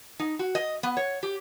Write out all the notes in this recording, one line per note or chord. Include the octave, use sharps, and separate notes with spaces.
D#4
F#4
D#5
B3
C#5
G4